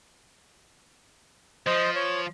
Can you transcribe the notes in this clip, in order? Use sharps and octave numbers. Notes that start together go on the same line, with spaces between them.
F3 C5 D#5
C#5